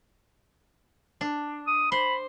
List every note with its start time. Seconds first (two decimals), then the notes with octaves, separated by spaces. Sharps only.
1.21 D4
1.67 D#6
1.92 C5 B5